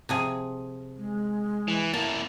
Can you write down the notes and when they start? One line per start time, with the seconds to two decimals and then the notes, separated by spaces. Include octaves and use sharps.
0.09 C3 F3 G#4
0.97 G#3
1.68 E3
1.93 A#3 E4 A5